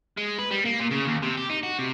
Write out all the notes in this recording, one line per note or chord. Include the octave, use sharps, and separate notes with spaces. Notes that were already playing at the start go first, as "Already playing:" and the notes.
G#3
B4
G3
A#3
A#2
C#3
D#2
C3
G4
D#4
F#4
C3